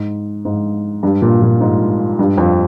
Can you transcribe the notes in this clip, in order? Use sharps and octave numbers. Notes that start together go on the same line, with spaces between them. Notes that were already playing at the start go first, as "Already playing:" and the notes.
Already playing: G#2
G#2
G2
A#2
A#2
G#2
G2
F2